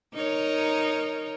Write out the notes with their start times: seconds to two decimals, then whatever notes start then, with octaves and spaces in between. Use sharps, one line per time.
0.14 D#4 A#4 C#5